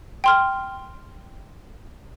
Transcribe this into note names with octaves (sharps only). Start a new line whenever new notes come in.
G5 C6 F6